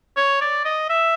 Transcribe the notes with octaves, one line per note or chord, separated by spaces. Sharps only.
C#5
D5
D#5
E5